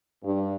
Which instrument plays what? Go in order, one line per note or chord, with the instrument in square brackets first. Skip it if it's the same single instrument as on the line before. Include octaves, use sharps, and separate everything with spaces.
[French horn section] G2